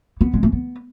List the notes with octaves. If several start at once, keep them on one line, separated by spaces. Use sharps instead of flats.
B3
G#3
A3
B3